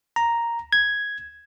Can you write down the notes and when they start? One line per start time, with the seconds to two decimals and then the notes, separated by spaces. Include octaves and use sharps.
0.16 A#5
0.73 G#6